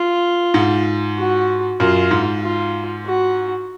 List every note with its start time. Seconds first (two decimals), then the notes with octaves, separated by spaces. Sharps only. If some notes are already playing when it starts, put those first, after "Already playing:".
Already playing: F4
0.54 G#2
1.18 F#4
1.80 F#2 F4
2.11 G#2
2.42 F4
3.06 F#4